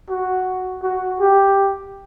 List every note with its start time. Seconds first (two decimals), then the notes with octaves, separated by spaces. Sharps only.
0.10 F#4
0.83 F#4
1.20 G4